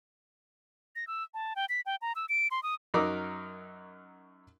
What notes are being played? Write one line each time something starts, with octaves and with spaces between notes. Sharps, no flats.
A#6
E6
A5
G5
B6
G5
A#5
E6
D7
C6
D#6
F#2 F#3 D#4 A#4 D6 E6